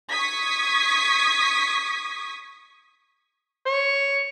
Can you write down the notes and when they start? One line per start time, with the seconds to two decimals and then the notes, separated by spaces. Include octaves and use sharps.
0.11 C#6 D#6 G#6 B6
3.66 C#5